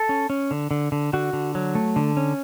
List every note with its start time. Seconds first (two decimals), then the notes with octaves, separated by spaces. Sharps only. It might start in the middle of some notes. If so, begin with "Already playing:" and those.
Already playing: A4
0.09 C#4
0.30 C#4
0.51 D3
0.71 D3
0.92 D3
1.13 D3 F#4
1.33 D3
1.55 F#3
1.75 A3
1.96 D3
2.17 C#4